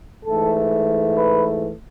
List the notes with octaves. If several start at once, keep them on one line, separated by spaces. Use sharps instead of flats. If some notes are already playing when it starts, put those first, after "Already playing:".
G#2 E3 A3 A4
B4